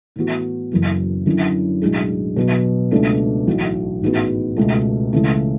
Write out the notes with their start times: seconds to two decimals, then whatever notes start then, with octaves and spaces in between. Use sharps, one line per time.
0.16 A2 E3 B3 F#4
0.72 F#1 F#2 E3
1.26 F#2 D3 F#3 C#4 E4
1.82 B1 A2 G#3 D4 G#4
2.36 B2 F#3 B3
2.91 C#2 B2 A3 D4 A4
3.47 B1 A2 E3 A3
4.02 A1 G#2 G#3 B3 F#4
4.56 C#2 B2 A3
5.13 C#2 C#3 E3 A3 C#4